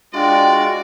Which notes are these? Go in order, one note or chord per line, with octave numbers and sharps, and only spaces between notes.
G#3 D4 F4 F#4 D5 G5